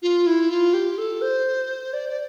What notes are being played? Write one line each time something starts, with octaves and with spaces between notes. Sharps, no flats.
F4
E4
F4
G4
A4
C5
D5
D5